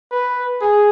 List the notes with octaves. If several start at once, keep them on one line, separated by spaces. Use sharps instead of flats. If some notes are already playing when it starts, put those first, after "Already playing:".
B4
G#4